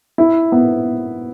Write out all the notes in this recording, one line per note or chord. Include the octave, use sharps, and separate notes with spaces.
E4
B3